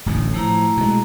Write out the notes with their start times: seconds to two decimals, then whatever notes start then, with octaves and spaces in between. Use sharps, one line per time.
0.06 D1 A1 D2
0.34 A2 F3 A3 E4 A#5
0.77 B2 G#3